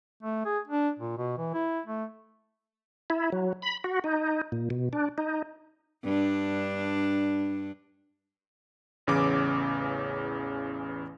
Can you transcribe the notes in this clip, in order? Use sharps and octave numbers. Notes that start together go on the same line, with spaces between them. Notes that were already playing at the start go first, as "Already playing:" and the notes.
A3
G#4
D4
A#2
B2
E3
E4
A3
E4
F#3
B5
F#4
D#4
A#2
B2
D4
D#4
G2 D4
A1 E2 C#3 E3 C#4 D6